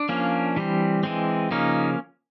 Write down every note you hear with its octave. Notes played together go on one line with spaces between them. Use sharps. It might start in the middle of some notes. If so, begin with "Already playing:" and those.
Already playing: D4
F3 A#3 C#4
E3 G3 C4
E3 G#3 C4
C#3 F3 A#3 C#4 D#4